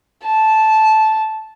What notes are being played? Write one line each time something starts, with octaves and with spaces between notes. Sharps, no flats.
A5